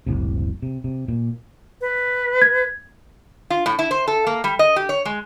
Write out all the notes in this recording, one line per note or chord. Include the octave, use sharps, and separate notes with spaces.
F#1 C#2 A2 C3
C3
C3
A#2
B4
G#6
F4
A2
E4
C5
A4
A#3
G3
D#5
G4
C#5
G#3